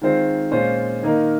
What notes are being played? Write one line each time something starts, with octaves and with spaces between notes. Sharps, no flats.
D#3 G#3 C4 F4 C5
A#2 G#3 C#4 F4 C5
D#3 A#3 D#4 A#4